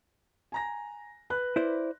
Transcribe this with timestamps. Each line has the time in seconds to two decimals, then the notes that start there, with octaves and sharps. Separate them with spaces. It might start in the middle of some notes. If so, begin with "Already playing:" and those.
0.52 G#5 A#5 A#6
1.30 B4 B5 F#6
1.56 E4 C5 D5